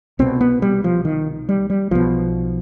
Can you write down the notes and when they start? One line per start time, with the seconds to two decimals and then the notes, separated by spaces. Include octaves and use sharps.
0.19 C2 B2 C4
0.41 B3
0.62 G3
0.84 F3
1.05 D#3
1.49 G3
1.70 G3
1.91 B1 B2 F3